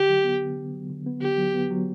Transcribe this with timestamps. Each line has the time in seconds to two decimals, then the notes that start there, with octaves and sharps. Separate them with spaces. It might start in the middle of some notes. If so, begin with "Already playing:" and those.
Already playing: D3 G4
0.09 F#3
0.24 B3
0.40 D3
0.57 D3
0.74 F#3
0.90 D3
1.06 B3
1.22 D3 G4
1.38 F#3
1.54 B3
1.71 F#3